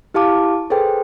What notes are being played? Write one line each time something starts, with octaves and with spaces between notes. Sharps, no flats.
E4 G4 F5 A5 D6
G#4 A4 B4 C5 G5